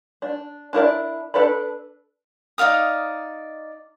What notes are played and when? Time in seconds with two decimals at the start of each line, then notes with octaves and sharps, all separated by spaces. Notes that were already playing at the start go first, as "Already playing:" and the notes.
0.22 D4
0.73 D4 E4 A#4 D5
1.34 D4 A4 B4 D5 B5
2.58 D#4 D5 F5 D#6